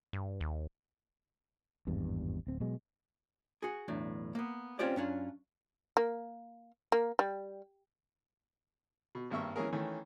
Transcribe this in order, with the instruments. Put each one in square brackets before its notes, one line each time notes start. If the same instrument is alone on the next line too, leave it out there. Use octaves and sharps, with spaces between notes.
[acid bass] G2
D#2
[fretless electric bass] G#1 E2 G2
D1 C4
B2 F#3 G#3
[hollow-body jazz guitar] F#4 G#4
B1 E2 A2 D4
A#3 B3
C4 C#4 F4 G4 C5 D5
F#2 C#4 D4 F4
[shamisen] A#3
A#3
G3
[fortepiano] B2
G#1 G2 A#3 E5 C#6
E3 G#3 A#3 C#4 G#4 A#4
D#3 E3 A3 C#4